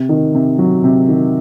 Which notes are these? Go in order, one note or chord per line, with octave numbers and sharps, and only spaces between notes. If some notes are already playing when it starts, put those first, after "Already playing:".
Already playing: C3
D#3
C3
F#3
C3
D#3